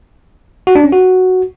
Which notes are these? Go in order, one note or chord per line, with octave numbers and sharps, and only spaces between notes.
F#4
D4
C#4
F#4